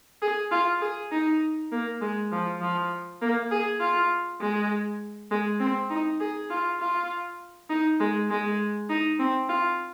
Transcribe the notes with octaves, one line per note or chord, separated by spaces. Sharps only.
G#4
F4
G#4
D#4
A#3
G#3
F3
F3
A#3
G#4
F4
G#3
G#3
C4
D#4
G#4
F4
F4
D#4
G#3
G#3
D#4
C4
F4